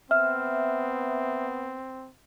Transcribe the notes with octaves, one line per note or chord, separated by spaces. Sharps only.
B3 C4 E5 F6